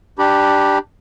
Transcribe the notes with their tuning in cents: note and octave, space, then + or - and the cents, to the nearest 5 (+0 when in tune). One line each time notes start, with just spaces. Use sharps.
D4 +10 G4 +0 B5 -40